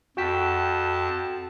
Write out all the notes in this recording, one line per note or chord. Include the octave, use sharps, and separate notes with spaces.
F2 F#4 G5 A5 B6